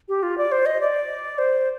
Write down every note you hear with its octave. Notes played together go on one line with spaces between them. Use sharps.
G4
F4
D5
C5
D#5
D5
C5